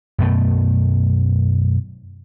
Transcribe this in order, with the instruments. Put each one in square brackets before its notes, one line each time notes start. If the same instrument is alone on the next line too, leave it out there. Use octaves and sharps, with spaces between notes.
[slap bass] F#2 B2 A3